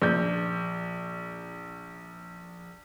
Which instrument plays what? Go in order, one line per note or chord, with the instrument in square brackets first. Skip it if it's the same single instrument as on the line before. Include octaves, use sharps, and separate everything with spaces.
[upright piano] A#1 G6